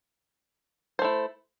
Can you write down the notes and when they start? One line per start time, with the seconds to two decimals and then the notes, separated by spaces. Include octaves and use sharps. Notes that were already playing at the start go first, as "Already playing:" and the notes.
0.99 C5
1.02 A3
1.04 E4